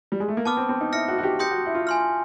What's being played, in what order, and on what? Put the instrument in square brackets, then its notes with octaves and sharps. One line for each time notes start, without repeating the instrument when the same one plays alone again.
[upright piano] G3
G#3
A3
A#3
[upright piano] B3 [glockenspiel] A5 D6 F6
[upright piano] C4
C4
D#4
[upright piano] E4 [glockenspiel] F6 A#6 C#7
[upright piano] F#4
F#4
G4
[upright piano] G4 [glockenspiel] C6 D#6 G6 A#6 C#7
[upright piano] F#4
E4
F4
[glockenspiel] G#5 C6 F6